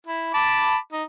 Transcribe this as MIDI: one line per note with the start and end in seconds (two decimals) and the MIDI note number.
0.07 0.32 64
0.34 0.77 81
0.34 0.77 83
0.34 0.77 86
0.93 1.03 63